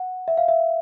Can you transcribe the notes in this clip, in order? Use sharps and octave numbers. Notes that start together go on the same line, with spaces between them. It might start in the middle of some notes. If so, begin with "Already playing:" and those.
Already playing: F#5
E5
F5
E5